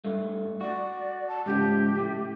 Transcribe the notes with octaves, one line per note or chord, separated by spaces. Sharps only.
G2 A3
F#4 D5
A5
G#2 C#3 F3 G4
A2